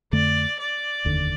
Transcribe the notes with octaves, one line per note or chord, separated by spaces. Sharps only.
F2 D3 A3 D5
D5
F1 D#2 D3